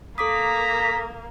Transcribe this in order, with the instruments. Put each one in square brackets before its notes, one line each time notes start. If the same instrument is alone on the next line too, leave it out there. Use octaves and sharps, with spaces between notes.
[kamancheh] A#3 A#4 [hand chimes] A4 D6 D#6 [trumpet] A#5 [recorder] B6